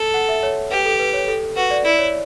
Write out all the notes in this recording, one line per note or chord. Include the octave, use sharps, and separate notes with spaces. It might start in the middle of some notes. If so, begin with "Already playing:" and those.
Already playing: A4
F#5
E5
C#5
G4 B4
A4
B4
C#5
A4
F#4 B4
D5
E4 D5
C#5